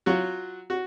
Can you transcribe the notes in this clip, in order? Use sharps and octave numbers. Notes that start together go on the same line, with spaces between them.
F#3 F4 F#4
F#4